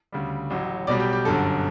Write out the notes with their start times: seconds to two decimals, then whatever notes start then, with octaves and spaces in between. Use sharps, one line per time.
0.12 D2 C#3 G3
0.50 A1 A2 F#3
0.87 B1 B2 G3 D5
1.00 G4
1.13 G4
1.25 G1 F#2 D3 A4